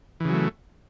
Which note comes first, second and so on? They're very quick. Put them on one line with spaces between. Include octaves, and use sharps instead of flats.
E3 C#3 F#3 A3